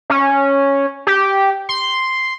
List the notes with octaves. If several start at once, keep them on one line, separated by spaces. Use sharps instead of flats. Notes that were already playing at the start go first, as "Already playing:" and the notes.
C#4
G4
C6